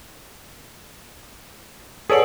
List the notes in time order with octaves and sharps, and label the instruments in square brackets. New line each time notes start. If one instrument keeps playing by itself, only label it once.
[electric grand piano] G#4 A4 C#5 [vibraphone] B4 D5 F#5